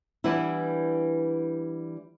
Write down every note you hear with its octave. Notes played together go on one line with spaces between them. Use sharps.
E3 G3 B3 D4 E4